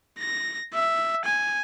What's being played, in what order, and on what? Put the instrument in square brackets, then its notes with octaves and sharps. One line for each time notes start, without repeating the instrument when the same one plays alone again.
[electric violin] A#6
E5
G#5